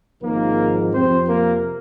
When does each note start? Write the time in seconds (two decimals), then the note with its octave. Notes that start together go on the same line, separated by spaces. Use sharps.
0.22 G#1 G#2 F3 A#3 A#4
0.92 F2 C3 F3 C4 C5
1.28 A#3 A#4